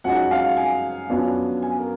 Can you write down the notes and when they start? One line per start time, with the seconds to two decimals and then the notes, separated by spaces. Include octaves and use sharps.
0.04 F#2 F3 G#3 D#4 F#5
0.31 F5
0.57 G#5
1.10 F#2 F3 B3 D4
1.62 G#5
1.79 A#4